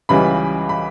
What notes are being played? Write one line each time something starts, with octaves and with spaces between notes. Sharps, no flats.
C#2 C#3 E3 G3 B5
B5